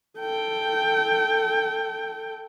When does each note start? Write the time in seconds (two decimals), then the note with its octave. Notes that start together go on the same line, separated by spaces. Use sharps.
0.19 A4 G5